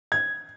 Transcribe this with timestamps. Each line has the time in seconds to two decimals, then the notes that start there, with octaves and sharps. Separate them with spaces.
0.12 G#6